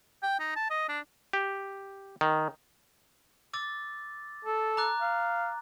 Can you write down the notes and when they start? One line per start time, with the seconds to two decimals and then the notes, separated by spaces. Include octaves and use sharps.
0.23 G5
0.40 D#4
0.56 A5
0.71 D#5
0.89 D4
1.33 G4
2.21 D#3
3.54 D6 E6 A6
4.45 A4
4.77 A#5 D6 F#6
5.01 F5